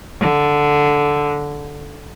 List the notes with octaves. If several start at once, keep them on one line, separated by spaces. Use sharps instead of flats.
D3